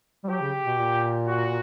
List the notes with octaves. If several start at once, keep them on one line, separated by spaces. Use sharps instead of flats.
G3
F#3 G4
C#3
B2
A#2
F#4